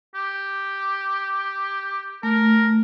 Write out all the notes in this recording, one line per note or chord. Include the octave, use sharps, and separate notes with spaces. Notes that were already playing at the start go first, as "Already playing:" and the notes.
G4
A3 A#4